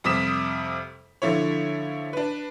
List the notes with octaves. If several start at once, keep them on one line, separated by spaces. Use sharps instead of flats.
F2 C3 G3 D#6 B6 E7
D3 F3 E4 C#5
D4 B4